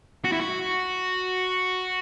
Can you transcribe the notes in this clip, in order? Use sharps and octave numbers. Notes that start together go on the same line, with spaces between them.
F#4
E4
F#4